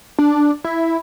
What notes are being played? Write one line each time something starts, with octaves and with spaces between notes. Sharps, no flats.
D4
E4